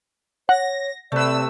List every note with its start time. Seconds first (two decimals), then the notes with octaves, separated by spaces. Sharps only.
0.49 C#5 F#5 A#6
1.12 C3 A3 B4 D5 E6